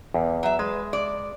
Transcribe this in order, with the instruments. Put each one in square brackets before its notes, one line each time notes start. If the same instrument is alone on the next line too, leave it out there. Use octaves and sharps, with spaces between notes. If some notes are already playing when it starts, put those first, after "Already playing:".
[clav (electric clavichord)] E2
[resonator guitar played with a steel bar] F#3 E5
[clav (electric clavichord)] G#3 [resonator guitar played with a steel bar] B4
[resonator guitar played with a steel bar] D5